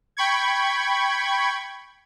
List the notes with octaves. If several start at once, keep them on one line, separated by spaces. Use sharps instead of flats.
G5 B5 C#6 G#6